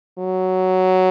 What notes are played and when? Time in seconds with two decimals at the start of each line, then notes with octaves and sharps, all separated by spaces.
0.19 F#3